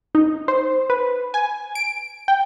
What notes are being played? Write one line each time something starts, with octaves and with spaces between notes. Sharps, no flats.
D#4
C5
B4
G#5
D7
G5